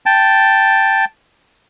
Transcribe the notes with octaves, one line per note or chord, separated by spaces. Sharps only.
G5 A5